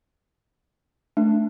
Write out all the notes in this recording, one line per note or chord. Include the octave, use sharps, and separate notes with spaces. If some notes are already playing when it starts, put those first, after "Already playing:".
A3 D4